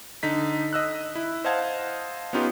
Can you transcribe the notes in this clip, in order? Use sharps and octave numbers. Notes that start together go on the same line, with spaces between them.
D3 D#4 B6
D#5 E6 F#6
E4
C5 D#5 F5 F#5 A5 G#6
B3 C#4 D#4 F4 G4